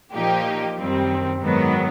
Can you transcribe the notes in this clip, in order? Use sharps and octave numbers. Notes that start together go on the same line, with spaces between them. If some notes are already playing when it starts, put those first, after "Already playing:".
A#2 F3 A#3 D#4 G4
F#2 D#3 G3 C4
G#2 D#3 F#3 B3